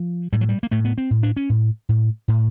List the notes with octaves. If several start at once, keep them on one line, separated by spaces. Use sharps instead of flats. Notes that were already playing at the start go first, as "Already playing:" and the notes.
Already playing: F3
A2 G3
F#3
G3
A#3
A2 A3
B3
C4
A2
D4
C#4
A2
A2
A2